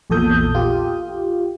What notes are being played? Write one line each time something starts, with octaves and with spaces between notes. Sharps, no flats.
A#1 E2 A#2 A4 D#6 G6
F4 G4